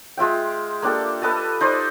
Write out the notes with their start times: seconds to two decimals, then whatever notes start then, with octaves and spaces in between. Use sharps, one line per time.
0.17 G#3 F4 E5 G5
0.82 A#3 D4 G4 A4
1.22 A4 B4 D#5 A5
1.61 D#4 C5 D5